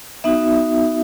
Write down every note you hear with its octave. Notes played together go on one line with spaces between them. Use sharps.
B3 D#4 F#4 E5